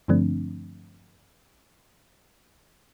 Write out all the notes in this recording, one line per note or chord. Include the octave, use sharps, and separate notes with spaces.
G2 D3 F3 A3 C4 D4